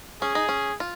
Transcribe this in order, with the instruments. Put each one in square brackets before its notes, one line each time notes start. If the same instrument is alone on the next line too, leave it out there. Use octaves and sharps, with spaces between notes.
[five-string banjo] C#4 [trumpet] G#4
[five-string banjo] D#4
C#4
F4